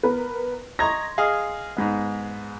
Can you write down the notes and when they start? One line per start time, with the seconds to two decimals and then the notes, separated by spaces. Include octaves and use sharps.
0.03 B3 A#4 B4
0.79 D#5 A#5 C6 C#6 G#6 A#6
1.18 G#4 D#5 F5
1.77 G#2 G#3 B3